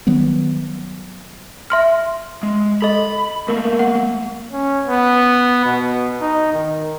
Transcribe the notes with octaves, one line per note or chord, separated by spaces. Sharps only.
D#3 F#3 G3 B3
E5 C6 F6
G#3
A4 D#5 B5
A3 A#3 A#4
F#5
C#4
B3
B2
D#4
D#3